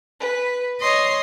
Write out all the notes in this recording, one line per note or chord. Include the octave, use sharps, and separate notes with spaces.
B4
C#5 D#5 C6